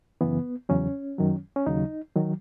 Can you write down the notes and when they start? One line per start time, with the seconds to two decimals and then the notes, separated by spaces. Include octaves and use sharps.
0.21 F#2 C#3 E3 B3
0.69 E2 C#3 F#3 C#4
1.18 F#2 D#3 F#3
1.56 C#4
1.66 D#2 C#3 F#3 D#4
2.16 D#3 F#3